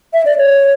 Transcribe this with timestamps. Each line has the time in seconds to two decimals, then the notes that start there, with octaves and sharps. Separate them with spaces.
0.13 E5
0.26 D5
0.38 C#5